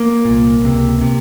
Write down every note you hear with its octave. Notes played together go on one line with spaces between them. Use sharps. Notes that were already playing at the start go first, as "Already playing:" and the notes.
Already playing: A#3
C2 A#2
C#2 C3
C3